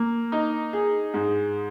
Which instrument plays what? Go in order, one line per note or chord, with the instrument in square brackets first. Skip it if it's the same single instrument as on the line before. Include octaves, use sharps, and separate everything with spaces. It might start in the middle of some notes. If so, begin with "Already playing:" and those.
Already playing: [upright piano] A#3
D#4
G#4
G#2